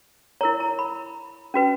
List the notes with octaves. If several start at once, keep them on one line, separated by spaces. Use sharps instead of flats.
E4 A#4 C#5 A#5
A#5
B5
C#4 F#4 B4